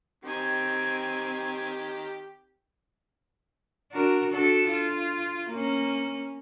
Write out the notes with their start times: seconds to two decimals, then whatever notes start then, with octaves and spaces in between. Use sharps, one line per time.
0.24 D#3 C4 G4 G#5
3.92 D4 F#4 A#4
4.31 D4 F#4 A4
4.68 F4
5.50 A#3 C#4